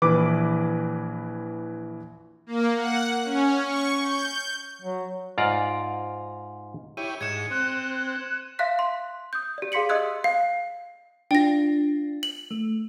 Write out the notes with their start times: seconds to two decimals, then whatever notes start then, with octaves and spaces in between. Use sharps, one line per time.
0.02 A#1 E3 E4 B4 D6 D7
2.46 A#3
2.76 F#5
3.24 C#4
3.64 C#6
4.01 G6
4.82 F#3
5.38 G#2 F4 D5 A#5
6.97 E4 G4 C#5 D#7
7.21 G#2 G#6 C#7 E7
7.51 C4 F#6
8.59 E5 F5 C6 F#6 B6
8.79 C6
9.33 D#6 G6
9.58 G4 D5
9.72 G#4 F5 C6 B6 C#7 F#7
9.89 D#5 C6 D#6 E6 F#6 G#6
10.24 F5
11.31 D4 F4 G5 A#6
12.23 F#7
12.51 A3